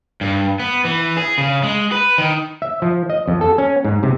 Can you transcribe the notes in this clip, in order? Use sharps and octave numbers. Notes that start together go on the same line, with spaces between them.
G2
B3
E3
G#4
C#3
G#3
B4
D#3
E5
F3
D#5
F2
A4
C#4
G#2
C3